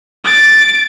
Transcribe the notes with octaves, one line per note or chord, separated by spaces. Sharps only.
A6 D7